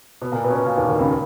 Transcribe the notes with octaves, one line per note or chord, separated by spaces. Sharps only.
B2 B3
A#2 A#3
B2 B3
C#4
B2 B3
A#2 A#3
D#2 D#3
D#2 D#3
C#2 C#3